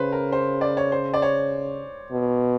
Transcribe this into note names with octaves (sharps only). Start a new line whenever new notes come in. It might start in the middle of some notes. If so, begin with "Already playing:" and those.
Already playing: C#3 B4 C5
A#4
C5
D5
C#5
C5
D5
C#5
B2